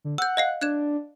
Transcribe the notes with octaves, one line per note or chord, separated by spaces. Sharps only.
D3
F#5 E6 G6
D#5 F5 C7
D4 F#6 G#6 E7